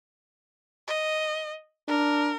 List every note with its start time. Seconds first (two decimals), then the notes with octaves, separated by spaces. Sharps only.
0.87 D#5
1.88 D4 A#4